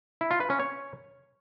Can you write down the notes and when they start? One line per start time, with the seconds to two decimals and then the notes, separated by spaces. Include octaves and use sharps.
0.21 E4
0.31 F4
0.40 B4
0.50 C#4
0.59 C#5